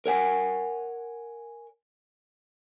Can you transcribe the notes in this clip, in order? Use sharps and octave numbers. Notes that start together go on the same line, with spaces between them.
A#4 C#5 F#5 G#5